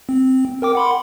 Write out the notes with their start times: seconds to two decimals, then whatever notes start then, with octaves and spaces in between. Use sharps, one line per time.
0.09 C4
0.62 A#4 G5 D6
0.75 F#5 B5 C6